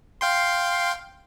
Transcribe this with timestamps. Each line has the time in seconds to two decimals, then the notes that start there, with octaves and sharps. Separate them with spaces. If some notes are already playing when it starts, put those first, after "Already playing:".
0.21 F5 G5 C6